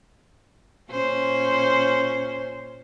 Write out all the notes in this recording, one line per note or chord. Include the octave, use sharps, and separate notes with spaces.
A#2 C#4 C5